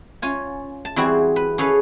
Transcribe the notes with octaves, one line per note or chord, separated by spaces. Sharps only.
C#4 F4 G#5
A5
E3 G3 C4 E4 F#4 G#4
B4
C#4 G#4 A4 B4 F5